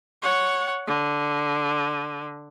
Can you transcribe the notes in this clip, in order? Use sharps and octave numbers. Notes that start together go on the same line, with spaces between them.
C#5 F#5
D3